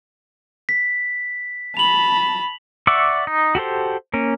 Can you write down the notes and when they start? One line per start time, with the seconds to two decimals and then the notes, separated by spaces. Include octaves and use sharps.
0.69 B6
1.77 A5 B5 F7 F#7
2.87 D5 E5 F#5 C#6 D6
3.27 D#4
3.55 F#4 G4 A4 C5
4.14 A#3 C#4